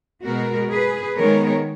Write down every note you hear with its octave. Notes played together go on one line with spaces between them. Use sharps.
B2 G#3 B3 F#4 A#4
G#4 B4
D#3 G#3 B3 A#4 C#5